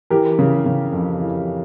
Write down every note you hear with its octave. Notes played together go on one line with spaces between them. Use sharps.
E3 G4 A#4
C#3
C#3
F2
E3